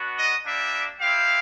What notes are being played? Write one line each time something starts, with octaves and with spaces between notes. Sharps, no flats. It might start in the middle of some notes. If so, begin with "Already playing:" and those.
Already playing: B3 D4 F#4
D#5
G3 A#3 D4 G4 E5
C4 E4 G4 F5